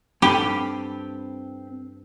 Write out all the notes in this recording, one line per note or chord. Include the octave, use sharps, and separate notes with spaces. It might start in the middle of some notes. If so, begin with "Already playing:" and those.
G2 C4 G4 A4 F5 G#5 B5